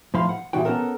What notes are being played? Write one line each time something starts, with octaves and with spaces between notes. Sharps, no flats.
A2 F3 C5 F5 B5 C6
F#5
A#2 E3 G3 D#4 F#4 G5
B3 C#4 A4 A#4